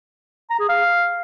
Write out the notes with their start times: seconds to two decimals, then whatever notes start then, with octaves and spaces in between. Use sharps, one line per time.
0.50 A#5
0.59 G#4
0.69 F5